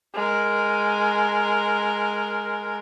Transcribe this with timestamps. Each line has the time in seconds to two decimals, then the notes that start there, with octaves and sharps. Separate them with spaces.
0.15 G#3 A#4